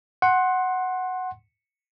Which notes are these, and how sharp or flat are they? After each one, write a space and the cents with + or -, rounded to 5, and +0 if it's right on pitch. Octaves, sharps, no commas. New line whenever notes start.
F#5 +0 C6 +20